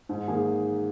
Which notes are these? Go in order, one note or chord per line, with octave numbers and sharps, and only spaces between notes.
G#2
D#3 A#3 G#4